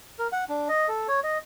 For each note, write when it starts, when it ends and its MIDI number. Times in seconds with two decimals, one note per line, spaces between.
0.19 0.28 70
0.32 0.44 78
0.49 0.68 62
0.69 0.88 75
0.88 1.07 69
1.08 1.20 73
1.24 1.38 75